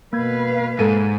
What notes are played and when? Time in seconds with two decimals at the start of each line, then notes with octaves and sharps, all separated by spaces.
0.13 B2 A#3 B4 F5 G#6
0.79 G#2 G#3 A4 D#7